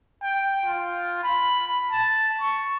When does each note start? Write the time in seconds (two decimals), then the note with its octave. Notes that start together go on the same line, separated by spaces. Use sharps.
0.23 G5
0.66 F4
1.23 B5
1.91 A5
2.41 C#6